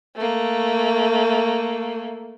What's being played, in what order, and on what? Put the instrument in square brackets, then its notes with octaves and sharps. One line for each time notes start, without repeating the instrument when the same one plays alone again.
[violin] A3 A#3